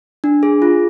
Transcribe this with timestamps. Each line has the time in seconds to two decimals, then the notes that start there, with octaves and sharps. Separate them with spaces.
0.24 D4
0.43 G#4
0.62 F4